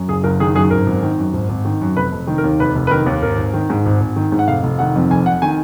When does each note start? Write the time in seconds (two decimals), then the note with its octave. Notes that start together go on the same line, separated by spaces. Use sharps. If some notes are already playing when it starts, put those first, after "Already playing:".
Already playing: F#2
0.08 F#1 G#4
0.23 F#1 A#4
0.40 D#3 G#4
0.55 F#2 G#4
0.71 G#1 A#4
0.86 G#1
1.03 D#3
1.18 F#2
1.34 G#1
1.49 G#1
1.65 D#3
1.81 F#2
1.96 F1 B4
2.12 F1
2.27 D#3
2.38 A#4
2.44 D#2
2.59 F1 B4
2.76 F1
2.87 B4
2.91 D#3 A#4
3.06 D#2
3.22 G#1 A#4
3.38 G#1
3.53 D#3
3.70 G#2
3.86 G#1
4.01 G#1
4.16 D#3
4.32 G#2
4.39 F#5
4.48 F1 F5
4.64 F1
4.79 D#3 F#5
4.96 F2
5.10 F1 G#5
5.26 F1 F#5
5.42 D#3 G#5